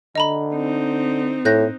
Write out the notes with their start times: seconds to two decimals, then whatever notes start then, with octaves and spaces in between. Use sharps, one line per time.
0.15 D3 D#5 A#5 B5
0.54 C4 D#4
1.45 A2 F#6 G6 A#6